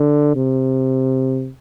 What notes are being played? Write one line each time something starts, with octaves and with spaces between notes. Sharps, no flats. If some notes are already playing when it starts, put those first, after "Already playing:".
Already playing: D3
C3